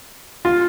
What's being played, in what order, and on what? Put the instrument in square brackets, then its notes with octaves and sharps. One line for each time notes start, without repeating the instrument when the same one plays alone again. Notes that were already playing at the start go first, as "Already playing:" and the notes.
[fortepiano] F4